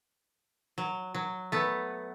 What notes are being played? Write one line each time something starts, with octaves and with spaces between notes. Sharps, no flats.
F#3
F#3
A3 B3